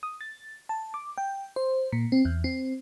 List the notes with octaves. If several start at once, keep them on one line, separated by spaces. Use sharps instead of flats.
D#6
A6
A5
D6
G5
C5
A#2
C4
E2
C4